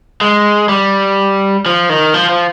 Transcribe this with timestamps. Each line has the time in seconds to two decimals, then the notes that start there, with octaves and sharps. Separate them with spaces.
0.21 G#3
0.69 G3
1.66 F3
1.89 D#3
2.14 F3
2.29 F3